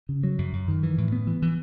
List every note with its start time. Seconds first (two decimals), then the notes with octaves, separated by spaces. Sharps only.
0.09 C#3
0.23 F#3
0.38 F#2
0.53 F#2
0.68 D#3
0.83 E3
0.98 A2
1.12 B3
1.27 E3
1.42 E3